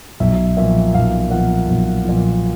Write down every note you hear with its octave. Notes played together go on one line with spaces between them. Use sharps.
B1 E5
A#2 F3 E5
B1 F5
A#2 F3 F#5
B1
A#2 F3